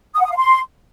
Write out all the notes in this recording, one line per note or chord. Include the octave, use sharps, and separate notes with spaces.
D#6
F#5
D#6
F5
C6